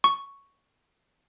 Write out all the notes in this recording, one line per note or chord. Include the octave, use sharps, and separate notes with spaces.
C#6